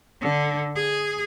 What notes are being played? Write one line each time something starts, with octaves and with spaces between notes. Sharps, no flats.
D3
G#4